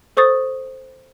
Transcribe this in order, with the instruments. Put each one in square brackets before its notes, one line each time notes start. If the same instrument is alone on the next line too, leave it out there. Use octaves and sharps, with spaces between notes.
[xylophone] A4 C5 C#6 D#6 A6